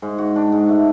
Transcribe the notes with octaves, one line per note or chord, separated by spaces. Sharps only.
G#2
F#4
D4
G#2
A3